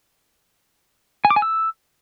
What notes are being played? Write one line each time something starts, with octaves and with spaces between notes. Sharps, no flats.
G#5
D6
G#5
E6